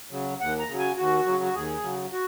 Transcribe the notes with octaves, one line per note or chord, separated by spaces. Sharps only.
C#3 F#3
D#2 F#5
A#5
C#3 F#3
G#5
D#2 F#4
C#3 F#3
F#4
D#2 G#4
C#3 F#3
F#4